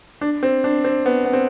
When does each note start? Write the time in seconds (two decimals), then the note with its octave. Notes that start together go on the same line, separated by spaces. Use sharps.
0.21 D4
0.43 C4
0.64 D4
0.84 C4
1.06 B3
1.25 B3
1.33 C4